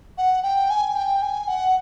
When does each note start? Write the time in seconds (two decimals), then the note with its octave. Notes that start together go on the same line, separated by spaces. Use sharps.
0.18 F#5
0.43 G5
0.70 G#5
0.96 G5
1.22 G#5
1.48 F#5